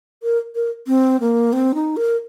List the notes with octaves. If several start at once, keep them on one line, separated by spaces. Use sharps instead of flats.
A#4
A#4
C4
A#3
C4
D#4
A#4